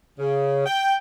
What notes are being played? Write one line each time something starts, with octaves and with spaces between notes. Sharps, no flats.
C#3
G5